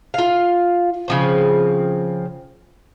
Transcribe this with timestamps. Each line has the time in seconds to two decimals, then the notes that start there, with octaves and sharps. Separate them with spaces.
0.14 F4 F5
1.08 C#3 F3 C4